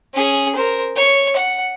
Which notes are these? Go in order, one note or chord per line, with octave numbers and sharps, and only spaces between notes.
C#4 G#4
A#4 C5
C#5
F#5